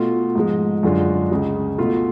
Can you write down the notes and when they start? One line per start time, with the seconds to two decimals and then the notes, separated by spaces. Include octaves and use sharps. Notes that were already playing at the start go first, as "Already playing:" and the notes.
Already playing: B2 A3 F4
0.35 G#2 F3 G#3
0.83 F#2 D3 G#3 D4 F4
1.31 C#2 C#3 G#3
1.78 B2 A3 F4